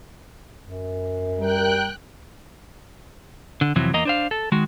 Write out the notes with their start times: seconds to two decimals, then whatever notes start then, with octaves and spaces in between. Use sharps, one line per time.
0.62 F#2
1.40 G3 A#4 G5 F#6
3.61 D3
3.76 F2 C3 E3 F#3
3.93 E2 A#3 D#5 A#5
4.05 D4 C5 F5
4.31 A4
4.52 D#3 G#3 F#4